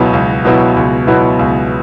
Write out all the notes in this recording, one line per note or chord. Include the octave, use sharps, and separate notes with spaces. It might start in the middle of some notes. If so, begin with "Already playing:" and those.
Already playing: C#2 B2 F#3 B3 E4
C#2
B2 F#3 B3 E4
C#2
B2 F#3 B3 E4
C#2